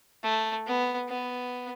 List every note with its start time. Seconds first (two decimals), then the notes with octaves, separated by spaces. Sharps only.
0.24 A3
0.66 B3
1.09 B3